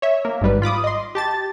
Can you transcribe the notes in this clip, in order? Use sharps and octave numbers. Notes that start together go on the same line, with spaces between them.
C#5 E5
A#3
G#1 G#2 G3 B4
F4 B5 D6 D#6
D#5 C6
G4 A5 A6